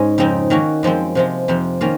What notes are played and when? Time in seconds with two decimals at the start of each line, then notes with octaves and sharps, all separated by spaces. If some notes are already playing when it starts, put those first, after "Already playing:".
Already playing: G#2 G#3 C#4
0.18 F2 C#3 F3 C4 D#4
0.50 D#3 A#3 C#4 F#4
0.83 F#2 F3 G#3 C4
1.15 C3 F3 G#3
1.48 F2 C3 F3
1.81 D#3 A#3 C#4 F4